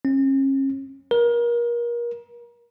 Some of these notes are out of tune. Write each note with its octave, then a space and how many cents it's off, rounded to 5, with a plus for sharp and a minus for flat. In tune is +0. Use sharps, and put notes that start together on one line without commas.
C#4 -40
A#4 +30